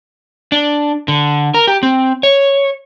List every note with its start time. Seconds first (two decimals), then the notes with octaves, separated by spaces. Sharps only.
0.52 D4
1.08 D3
1.54 A#4
1.67 G4
1.83 C4
2.23 C#5